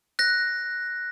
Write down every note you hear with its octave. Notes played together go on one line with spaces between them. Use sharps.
F#6 A#6